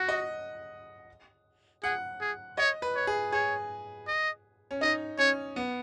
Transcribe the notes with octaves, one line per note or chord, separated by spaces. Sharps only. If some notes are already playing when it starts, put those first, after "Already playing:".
Already playing: F#4 F#5
D#5
G#4 F#5
G#4
C#5 D#5
B4
C#5
G#4
G#4 C#5
D#5
C#4
D#4 D#5
C#4 C#5
B3